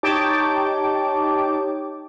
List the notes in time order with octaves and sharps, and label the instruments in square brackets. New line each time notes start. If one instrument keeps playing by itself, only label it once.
[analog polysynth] D#4 G4 C#5 G5 A5 D6